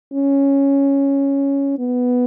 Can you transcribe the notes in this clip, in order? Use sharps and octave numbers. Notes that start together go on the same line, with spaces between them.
C#4
B3